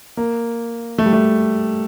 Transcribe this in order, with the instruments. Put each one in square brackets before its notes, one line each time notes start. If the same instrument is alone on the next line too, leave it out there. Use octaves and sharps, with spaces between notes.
[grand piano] A#3
A3
G3
A3